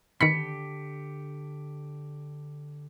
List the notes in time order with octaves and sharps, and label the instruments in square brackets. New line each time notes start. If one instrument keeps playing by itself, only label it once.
[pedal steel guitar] D3 G4 [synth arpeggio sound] D#3 B5 [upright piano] B6 C#7